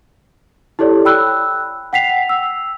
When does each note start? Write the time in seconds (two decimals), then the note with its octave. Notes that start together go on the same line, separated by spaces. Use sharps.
0.79 E4 G4 A4 C#5 D5
1.05 G5 B5 E6 F#6
1.93 F#5 G5 B6 C7 F7
2.29 E6